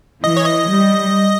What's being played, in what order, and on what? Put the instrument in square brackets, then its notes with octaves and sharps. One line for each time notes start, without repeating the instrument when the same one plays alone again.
[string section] E3 [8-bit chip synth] D#5
[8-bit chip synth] C#5
D#5
[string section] G3